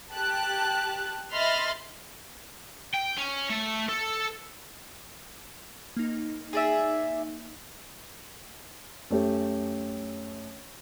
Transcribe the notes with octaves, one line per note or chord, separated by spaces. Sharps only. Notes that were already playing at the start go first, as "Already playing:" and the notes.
G4 A5 F#6
D#5 E5 B5 C6 F6 A6
G5
C#4
A3
A4
A#3 D#4
G#4 D5 E5
F#2 A3 C#4 G4